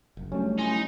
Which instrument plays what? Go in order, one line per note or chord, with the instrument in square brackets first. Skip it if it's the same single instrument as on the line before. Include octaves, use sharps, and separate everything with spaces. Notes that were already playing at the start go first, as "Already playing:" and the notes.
[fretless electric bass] F#1
[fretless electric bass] F#3 G3 D4 [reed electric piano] A3 C#4
[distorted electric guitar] D#4 [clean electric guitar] E4 G#5 C6